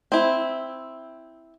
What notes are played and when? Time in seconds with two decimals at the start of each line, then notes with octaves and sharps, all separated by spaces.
0.12 C4 E4